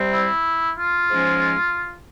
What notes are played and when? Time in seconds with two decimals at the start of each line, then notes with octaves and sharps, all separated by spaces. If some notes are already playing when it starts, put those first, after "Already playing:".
Already playing: C3 G3 C4
0.13 E4
0.78 F4
1.09 G#2 F3 G#3 C#4